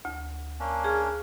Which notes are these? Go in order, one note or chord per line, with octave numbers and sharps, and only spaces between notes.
D2
A#3 C#4 D4
G#4 F6